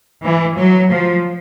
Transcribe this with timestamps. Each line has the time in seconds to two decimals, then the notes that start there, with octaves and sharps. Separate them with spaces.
0.23 E3
0.57 F#3
0.91 F3